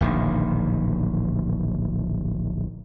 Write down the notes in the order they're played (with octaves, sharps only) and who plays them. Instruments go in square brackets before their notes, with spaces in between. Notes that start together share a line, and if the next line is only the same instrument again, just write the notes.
[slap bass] D1 A#1 D#3